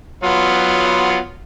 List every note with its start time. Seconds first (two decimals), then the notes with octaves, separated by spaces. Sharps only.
0.23 F#3 B3 F4